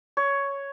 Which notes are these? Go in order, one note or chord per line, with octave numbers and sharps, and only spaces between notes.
C#5